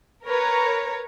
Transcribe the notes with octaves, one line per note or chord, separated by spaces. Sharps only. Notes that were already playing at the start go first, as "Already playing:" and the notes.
A#4 B4 C#5 A#5